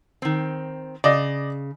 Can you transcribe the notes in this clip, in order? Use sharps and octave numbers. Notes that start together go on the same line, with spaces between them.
D#3 C4
C#3 D5 D#5